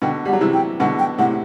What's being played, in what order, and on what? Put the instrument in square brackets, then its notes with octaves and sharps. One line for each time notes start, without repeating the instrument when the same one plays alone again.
[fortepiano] B2 D3 [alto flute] G5
[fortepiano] G3 [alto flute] F#5
[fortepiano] F#3
C3 E3
[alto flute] G5
[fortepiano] B2 D3 [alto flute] F#5
[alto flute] G5
[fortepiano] A2 C3 [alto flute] F#5